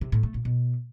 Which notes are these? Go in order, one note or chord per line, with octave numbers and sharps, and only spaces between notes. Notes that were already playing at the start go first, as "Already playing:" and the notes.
C3
A2
A3
A#2
B2